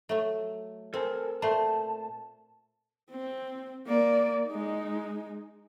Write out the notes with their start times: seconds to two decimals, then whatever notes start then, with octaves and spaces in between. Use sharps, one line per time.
0.09 F#3 A3
0.94 C4 A4 A#4 G#5
1.42 A#2 A3 C5 A5
3.11 C4
3.86 A#3 D5
4.47 G#3 D#4